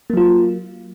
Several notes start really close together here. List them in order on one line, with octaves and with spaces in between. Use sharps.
A#3 F#3 F4